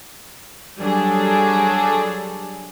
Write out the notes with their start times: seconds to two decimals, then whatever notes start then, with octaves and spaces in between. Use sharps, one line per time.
0.79 F#3 G3 D4 G#4 A4